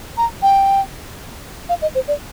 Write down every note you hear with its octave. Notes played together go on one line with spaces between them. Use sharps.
A#5
G5
F5
D#5
C5
D5